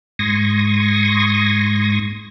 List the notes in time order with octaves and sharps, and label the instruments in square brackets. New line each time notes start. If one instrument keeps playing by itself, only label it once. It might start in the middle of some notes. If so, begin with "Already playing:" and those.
[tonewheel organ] G#2 C6 C#6 D#6 G#6 A#6